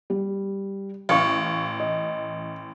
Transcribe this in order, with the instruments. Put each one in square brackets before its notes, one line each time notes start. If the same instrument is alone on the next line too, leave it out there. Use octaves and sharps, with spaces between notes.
[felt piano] G3
[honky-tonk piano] A1 [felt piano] F5 C#6
[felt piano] D#5